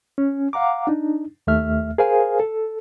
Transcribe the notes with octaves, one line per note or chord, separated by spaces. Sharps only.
C#4
F5 F#5 A#5 D6
D4 D#4
D#2 A3 E5 F6
G#4 A#4 C5 F5 G#5
A4